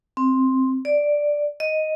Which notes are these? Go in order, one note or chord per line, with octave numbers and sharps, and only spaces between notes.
C4
D5
D#5